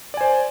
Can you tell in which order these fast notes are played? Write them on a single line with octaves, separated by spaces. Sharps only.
D5 G#5 C5